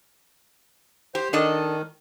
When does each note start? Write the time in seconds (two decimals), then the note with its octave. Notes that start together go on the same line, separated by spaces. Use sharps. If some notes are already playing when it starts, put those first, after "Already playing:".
1.15 G4 C5
1.33 D#3 D4 A4 D#5